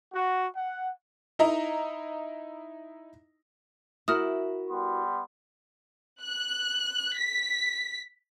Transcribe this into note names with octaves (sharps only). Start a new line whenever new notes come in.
F#4
F#5
D#4 E4 D#5 A#5
E4 F#4 A#4 D#6 F6
G3 B3 C6
F#6
B6